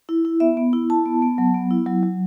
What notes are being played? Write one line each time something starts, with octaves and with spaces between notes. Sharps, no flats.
E4
E4
B3 E5
B3
E4
E4 A5
B3
B3
F#3
B3
E4
F#3
F#3